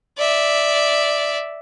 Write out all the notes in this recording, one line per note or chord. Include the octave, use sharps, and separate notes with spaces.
D5 E5